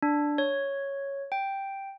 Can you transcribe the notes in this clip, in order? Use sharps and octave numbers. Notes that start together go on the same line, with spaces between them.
D4
C#5
G5